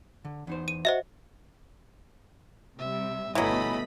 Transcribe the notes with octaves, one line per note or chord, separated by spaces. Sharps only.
D3
E2 D#4 C5
D#7
F#4 C5 D#5 E5 F#5
C3 G3 E5
G1 B2 E3 F#3 A3 D#5 B5